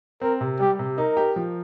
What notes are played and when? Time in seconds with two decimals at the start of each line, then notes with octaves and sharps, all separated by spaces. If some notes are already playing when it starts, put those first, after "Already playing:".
0.21 C4 A#4
0.41 C3
0.60 G3 G4
0.79 C3
0.98 D#4 A#4
1.17 G4
1.36 F3